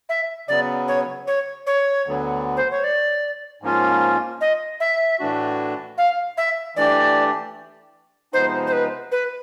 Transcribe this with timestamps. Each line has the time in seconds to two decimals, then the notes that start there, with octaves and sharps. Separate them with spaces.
0.09 E5
0.48 C#3 F#3 B3 D5
0.88 C#5
1.27 C#5
1.67 C#5
2.06 D2 D3 F#3 B3
2.57 C5
2.71 C#5
2.84 D5
3.62 G#2 F3 A#3 C#4 F4
4.41 D#5
4.80 E5
5.19 A2 E3 A3 D4 F#4
5.98 F5
6.37 E5
6.76 E3 A3 D4 G4 D5
8.33 C3 F3 G#3 B3 D#4 C5
8.67 C5
8.72 B4
9.12 B4